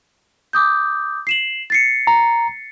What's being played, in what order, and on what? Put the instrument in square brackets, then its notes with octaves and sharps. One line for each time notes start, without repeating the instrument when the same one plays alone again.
[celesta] D6 D#6 G6
C7 E7 F#7
A6 C7 C#7
[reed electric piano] A#5